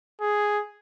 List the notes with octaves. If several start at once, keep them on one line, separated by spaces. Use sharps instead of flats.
G#4